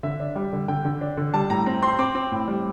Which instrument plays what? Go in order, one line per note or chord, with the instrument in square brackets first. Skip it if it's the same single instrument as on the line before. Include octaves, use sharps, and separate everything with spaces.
[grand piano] D3 E5
D4
G3
D3
D3 G5
D3
D4
D3
G3 A5
A2 A#5
C4 A#5
C4 C6
C4 D6
C4
A2
G3